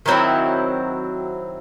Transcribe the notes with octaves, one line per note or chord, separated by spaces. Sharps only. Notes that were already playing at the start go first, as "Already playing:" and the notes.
D#3 F#3 C4 E4